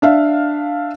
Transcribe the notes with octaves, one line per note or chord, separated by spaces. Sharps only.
D4 E5 F5